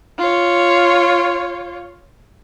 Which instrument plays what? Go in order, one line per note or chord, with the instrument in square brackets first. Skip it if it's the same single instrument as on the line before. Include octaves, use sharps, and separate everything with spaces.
[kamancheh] F4 C#5